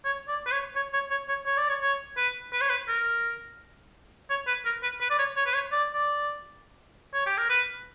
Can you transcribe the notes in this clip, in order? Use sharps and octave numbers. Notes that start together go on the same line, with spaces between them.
C#5
D5
B4
C#5
C#5
C#5
C#5
C#5
C#5
D5
C#5
C#5
B4
B4
C#5
B4
A#4
C#5
B4
A#4
B4
B4
D5
C#5
C#5
B4
C#5
D5
D5
C#5
G4
A#4
B4